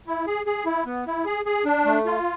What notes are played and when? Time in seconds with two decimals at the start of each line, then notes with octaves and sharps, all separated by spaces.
0.07 E4
0.27 G#4
0.46 G#4
0.65 E4
0.86 B3
1.06 E4
1.26 G#4
1.46 G#4
1.65 D4
1.85 A3
2.06 F4